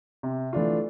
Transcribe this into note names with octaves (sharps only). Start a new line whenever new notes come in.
C3
E3 A3 D4 F4